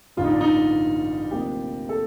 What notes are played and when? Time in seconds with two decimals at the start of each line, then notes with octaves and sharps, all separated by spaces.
0.17 A1 G2 D3 F4
0.24 D#4
0.33 D4
0.41 D#4
1.31 D2 C3 F3 A#3 G4
1.89 A4